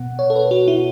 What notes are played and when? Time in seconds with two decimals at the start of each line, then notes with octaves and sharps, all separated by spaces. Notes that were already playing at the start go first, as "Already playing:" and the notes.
Already playing: B2 B3 F#5
0.19 C#5
0.30 A4
0.36 B4
0.51 F#4
0.68 E4